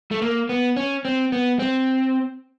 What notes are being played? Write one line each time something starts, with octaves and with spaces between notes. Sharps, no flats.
A3
A#3
B3
C#4
C4
B3
C4